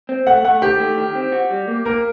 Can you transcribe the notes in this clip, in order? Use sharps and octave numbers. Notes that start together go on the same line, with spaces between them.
C4
A3 F#5
A3 F#5
D#3 G4
A3
D#3
C4
F#4
G3
A#3
A#3 A#4